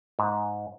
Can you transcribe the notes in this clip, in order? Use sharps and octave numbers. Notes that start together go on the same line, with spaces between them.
G#2